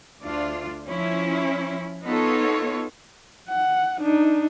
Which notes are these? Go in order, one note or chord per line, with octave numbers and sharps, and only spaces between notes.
D2 D4 F4 D5
F3 C#4 E4
B3 D#4 F4 A4 C#5
F#5
D4 D#4